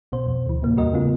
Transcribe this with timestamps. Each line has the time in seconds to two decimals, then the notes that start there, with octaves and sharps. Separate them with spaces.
0.12 B1 B2 C5
0.26 F2
0.46 D2 E3
0.62 A2 C3 A#3
0.77 E2 G3 F#4 A#4 D#5
0.93 C#3 A3 B3 F4